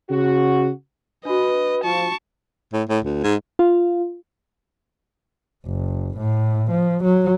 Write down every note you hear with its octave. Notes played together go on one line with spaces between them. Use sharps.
C#3 F#4
D4 F#4 B4 D#5
F3 A5 C#6
A2
A2
D2
G#2
F4
F#1
A2
F3
F#3